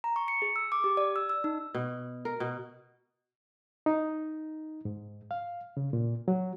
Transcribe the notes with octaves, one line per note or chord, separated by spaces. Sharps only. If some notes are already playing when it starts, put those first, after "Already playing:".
A#5
C#6
C#7
G#4
E6
D6
G4
D5
E6
E6
D#4
B2
A#4
B2
D#4
G#2
F5
C#3
A#2
F#3